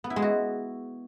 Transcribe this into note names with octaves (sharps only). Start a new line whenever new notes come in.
B3
E4
G#3
F#4